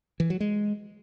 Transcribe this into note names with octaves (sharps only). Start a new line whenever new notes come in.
E3
F#3
G#3